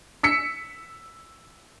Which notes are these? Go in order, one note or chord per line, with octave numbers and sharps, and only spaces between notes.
E6 B6 C#7